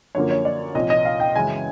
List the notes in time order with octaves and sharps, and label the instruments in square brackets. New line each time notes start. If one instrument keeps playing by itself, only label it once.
[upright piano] F#2 D3 F3 A#3 C#5
C#5
D5
C2 A#2 F3 D#5
D#5
F5
G5
F#2 C#3 E3 G#3 G#5